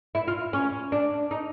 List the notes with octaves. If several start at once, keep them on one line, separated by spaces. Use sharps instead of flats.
E4
F4
C#4
D4
D#4